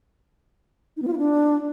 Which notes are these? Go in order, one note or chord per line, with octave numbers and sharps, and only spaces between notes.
D#4
B3
F4
E4
D4